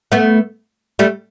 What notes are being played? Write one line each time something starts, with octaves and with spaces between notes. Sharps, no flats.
A3 B3
G3 A3